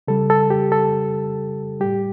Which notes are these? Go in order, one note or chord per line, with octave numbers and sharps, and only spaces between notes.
C#3 G3 A4
A4
G4
A4
A2 G3 G4